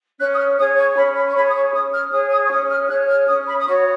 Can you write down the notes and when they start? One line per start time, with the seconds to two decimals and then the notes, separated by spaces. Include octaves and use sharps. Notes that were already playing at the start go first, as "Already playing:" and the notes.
0.19 C#4 F#6
0.32 D#6
0.38 F6
0.57 G#4 C#5 D#6
0.77 C#6
0.96 C#4 B5
1.15 B5
1.28 C#6
1.34 G#4 C#5 B5
1.48 D#6
1.54 C#6
1.73 C#4 D#6
1.93 F6
2.11 G#4 C#5 D#6
2.30 D#6
2.45 C#6
2.50 C#4 D#6
2.70 F6
2.88 G#4 C#5 F#6
3.08 F6
3.27 C#4 D#6
3.47 B5
3.58 D#6
3.66 F#4 C#5 C#6